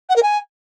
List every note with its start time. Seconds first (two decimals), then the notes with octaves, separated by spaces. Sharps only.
0.09 F#5
0.15 A#4
0.22 G#5